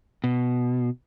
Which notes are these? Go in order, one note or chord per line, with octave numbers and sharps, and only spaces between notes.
B2